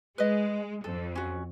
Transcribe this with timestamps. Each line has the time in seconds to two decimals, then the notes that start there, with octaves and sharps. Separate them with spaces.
0.18 G#3 B4 D#5
0.84 F2 A4
1.15 C#4 F#4